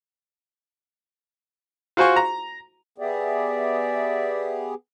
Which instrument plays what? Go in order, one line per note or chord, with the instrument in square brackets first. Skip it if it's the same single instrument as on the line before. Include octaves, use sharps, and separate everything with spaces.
[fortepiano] F4 F#4 C5 G#5 C#6
A#5
[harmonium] B3 G4 G#4 [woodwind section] D5 E5